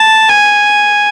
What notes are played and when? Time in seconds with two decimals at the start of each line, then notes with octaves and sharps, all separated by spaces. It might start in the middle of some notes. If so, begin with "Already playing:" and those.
Already playing: A5
0.29 G#5